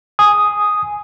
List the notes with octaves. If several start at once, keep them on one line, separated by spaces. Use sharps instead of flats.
G#5 D#6